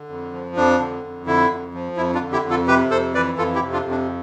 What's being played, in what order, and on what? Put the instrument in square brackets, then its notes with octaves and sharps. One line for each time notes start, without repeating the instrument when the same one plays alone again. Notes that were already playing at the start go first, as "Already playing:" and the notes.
Already playing: [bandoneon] D3
F2
F3
F2 D4
D3
F2
D3 E4
F2
F3
F2 E4
D4 F4
D3
E4 G4
F2
F4 A4
C3 G4 B4
F2 A4 C5
E3 B4 D5
F2 F4 A4
E4 G4
C3
D4 F4
F2
D4